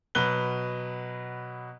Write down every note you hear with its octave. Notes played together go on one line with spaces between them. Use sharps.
B2 F#3 B4 F#6 G7